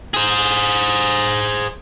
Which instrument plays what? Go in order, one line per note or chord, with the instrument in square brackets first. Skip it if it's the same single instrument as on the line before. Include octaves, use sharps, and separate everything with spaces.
[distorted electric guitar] G#4 C5